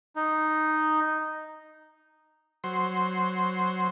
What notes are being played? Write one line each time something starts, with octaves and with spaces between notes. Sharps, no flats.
D#4
F#3 C5 C6